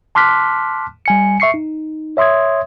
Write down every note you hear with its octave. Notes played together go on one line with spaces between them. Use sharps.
A5 C6 D6 F6 F#6 B6
G3 G#5 C#7
E5 C#6 C7 C#7
D#4
C#5 E5 C6 D#6 G#6